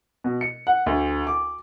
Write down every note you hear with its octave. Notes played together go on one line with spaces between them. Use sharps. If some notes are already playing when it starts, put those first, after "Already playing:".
B2
C#7
F#5
D2
D6